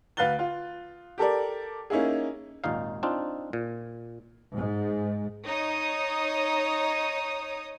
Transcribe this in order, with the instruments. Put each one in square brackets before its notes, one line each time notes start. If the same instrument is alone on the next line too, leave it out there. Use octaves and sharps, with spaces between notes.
[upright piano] D2 B4 F5 F#6 A6 G7
F4
G4 A4 A#4 D5
A#3 C#4 D#4 E4 G#4
[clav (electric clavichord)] G#1 D#2 A#2 D#4 F5
C4 D4 D#4 F4
A#2
[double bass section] G#2
[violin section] D#4 C#5 D#6